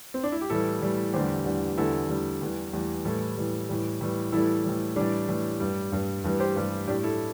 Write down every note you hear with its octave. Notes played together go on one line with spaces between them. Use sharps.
C4
D4
E4
G4
A2 E3 G3 E4 A4
A2 E3 G3
E2 D3 G3 G4 C5
E2 D3 G3
E2 D3 G3 E4 A4
E2 D3 G3
E2 E3 G3
E2 E3 G3
A2 E3 G3 E4 A4
A2 E3 G3
A2 E3 G3
A2 E3 G3
A2 E3 G3 E4 A4
A2 E3 G3
A2 E3 G3 D4
A2 E3 G3
G2 G3
G2 G3
G2 E3 G3
G4 C5
G2 E3 G3
A2 G3 D4 G4
E4 A4